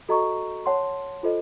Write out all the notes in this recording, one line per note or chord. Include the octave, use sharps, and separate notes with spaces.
F#4 A4 D#5 A#5 C#6
C#5 F#5 A5 C6
F4 A4 C5 D#5